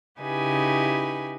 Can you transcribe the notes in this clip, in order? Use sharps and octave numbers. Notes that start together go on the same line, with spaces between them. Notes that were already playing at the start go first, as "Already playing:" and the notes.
C#3 D#4 E4 G4 B4 G#5